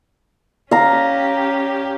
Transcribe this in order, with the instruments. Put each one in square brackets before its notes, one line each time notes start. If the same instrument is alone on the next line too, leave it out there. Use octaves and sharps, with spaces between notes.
[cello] C#4 G4 [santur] F5 A#5